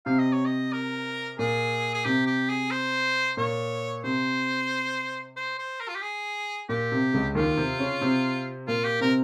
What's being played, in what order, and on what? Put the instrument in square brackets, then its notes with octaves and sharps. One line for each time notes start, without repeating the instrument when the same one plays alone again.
[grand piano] C3 [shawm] F5
[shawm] D#5
C#5
D#5
A#4
[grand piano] A#2 [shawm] G#4
[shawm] G#4
[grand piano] C3 [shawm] G4
[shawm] G4
G#4
C5
[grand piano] A#2 [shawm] C#5
[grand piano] C3 [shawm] C5
[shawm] C5
C5
A#4
F4
G4
G#4
[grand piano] A#2 [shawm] G4
[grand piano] C3
C#2 C#3
[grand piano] D#2 D#3 [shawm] F4
[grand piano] C3 C4
C#3 C#4
C3 C4
[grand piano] A#2 A#3 [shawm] F4
[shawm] G4
[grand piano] C3 C4 [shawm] A#4